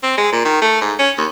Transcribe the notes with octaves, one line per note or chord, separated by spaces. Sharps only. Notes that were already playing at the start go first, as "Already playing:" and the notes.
C4
G#3
A#2
D#3
A3
G#2
C#4
D#2